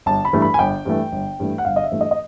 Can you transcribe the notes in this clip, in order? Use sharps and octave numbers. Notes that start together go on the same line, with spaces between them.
G1 A5
B5
G2 E3 A3
B5
G#5
G1 G5
G2 E3 A3
G1
G2 E3 A3
F#5
G1 F5
D#5
E5
G2 E3 A3
D#5
D#5